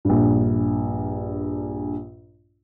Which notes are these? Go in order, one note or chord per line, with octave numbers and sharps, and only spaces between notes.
A#1 G2